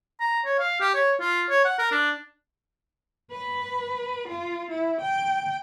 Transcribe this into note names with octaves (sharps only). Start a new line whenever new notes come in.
A#5
C#5
F5
G4
C#5
F4
C#5
F#5
A#4
D4
B4
F4
E4
G5